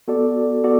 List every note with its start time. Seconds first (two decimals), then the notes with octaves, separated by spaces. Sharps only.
0.08 B3 F#4 A4 D5
0.64 B3 F#4 A4 D5